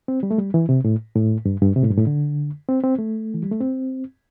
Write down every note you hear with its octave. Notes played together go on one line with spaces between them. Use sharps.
C4
G3
A3
G3
E3
C3
A2
A2
G2
G2
C3
A2
G2
A2
D3
C4
C4
A3
E3
G3
A3
C4